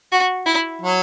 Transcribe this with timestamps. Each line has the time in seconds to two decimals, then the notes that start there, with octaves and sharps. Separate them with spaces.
0.12 F#4
0.46 E4
0.82 F#3